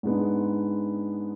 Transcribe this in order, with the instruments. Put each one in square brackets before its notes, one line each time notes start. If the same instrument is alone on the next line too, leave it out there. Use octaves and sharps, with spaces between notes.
[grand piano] G#2 G#3 B3 D4